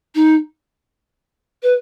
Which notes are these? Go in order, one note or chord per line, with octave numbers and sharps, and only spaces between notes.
D#4
B4